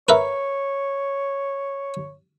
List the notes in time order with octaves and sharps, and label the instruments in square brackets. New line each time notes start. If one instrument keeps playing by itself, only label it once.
[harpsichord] A#4 B4 E5 [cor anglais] C#5